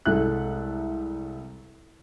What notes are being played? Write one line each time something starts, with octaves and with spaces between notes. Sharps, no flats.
C2 G#3 A4 E5 F#6